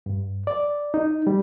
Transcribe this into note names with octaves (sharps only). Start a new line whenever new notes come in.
G2
D5
D#4
G3